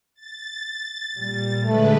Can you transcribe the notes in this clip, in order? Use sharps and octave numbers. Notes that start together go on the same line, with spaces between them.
A6
A#2 G3
D3 G#3 A3 B4